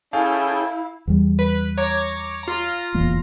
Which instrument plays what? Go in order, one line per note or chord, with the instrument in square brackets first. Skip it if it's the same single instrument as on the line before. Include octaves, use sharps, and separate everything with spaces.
[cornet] C#4 [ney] E4 [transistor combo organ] G#4 A4 G5 [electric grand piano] F5
[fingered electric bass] E2 G3
[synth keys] B4
C#5 A#5 D6
F4 A#5
[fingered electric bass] D1 E2 A#3